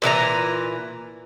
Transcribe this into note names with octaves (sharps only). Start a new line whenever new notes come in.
A#2 E3 G4 A#5